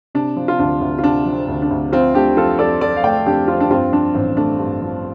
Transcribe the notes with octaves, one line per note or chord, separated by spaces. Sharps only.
C3 D4
F3
F4
D2 D4
D2
F4
C3 D4
F3
C4
D2
D4
D2
F3 C4 F4
A3 D4 G4
F2 F4 A4
F2 A4 D5
F3 A4 D5
F5
A3 D5 G5
F2 D4 G4
F2 C4 F4
D4
G2 C4 F4
F3 D4
A1 C4
A3 D4
G2
F3